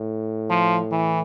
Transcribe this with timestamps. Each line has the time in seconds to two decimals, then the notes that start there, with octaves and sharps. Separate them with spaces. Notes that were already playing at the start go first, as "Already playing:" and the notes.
Already playing: A2
0.50 F3
0.91 E3